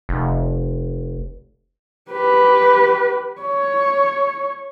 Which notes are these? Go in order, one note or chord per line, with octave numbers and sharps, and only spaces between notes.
F1
G4 B4
C#5